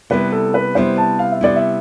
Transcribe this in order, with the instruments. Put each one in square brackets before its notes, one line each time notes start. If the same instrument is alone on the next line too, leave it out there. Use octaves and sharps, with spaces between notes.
[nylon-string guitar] C3 G3 B3 E4 [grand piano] B4
[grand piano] A4
B4
[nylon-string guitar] C3 G3 B3 E4 [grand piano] C5
[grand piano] A5
F5
E5
[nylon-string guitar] C3 G3 B3 E4 [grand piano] D5
[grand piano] E5